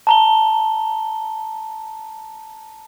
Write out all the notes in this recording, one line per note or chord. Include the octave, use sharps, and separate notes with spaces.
A5 A#5 G7